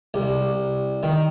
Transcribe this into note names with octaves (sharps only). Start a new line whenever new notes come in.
C2
D#3